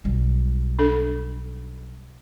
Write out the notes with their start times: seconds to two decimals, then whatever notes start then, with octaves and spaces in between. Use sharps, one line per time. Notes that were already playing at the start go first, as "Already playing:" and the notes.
0.04 B1 G3
0.79 D4 A4